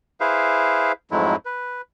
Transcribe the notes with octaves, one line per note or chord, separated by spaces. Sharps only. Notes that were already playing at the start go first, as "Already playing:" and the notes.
E4 G#4 B4 C5 E5 F5
F2 G#2 F#3 G#3 A3 E4
B4